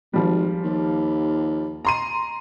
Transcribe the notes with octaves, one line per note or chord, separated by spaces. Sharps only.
G#1 F3 G3
D#2
A#5 C6 D#7